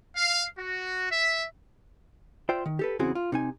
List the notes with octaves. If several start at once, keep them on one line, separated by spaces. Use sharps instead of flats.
F5
F#4
E5
F4 C5 D5 E5 G5
D#3
G4 A4 B4
E2 C#3 C4 E4 F#4 G#4
F4
C3 D#4 G#5